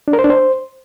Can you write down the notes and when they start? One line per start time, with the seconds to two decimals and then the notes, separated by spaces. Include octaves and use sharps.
0.08 D4
0.13 A#4
0.19 C5
0.24 D4
0.30 C5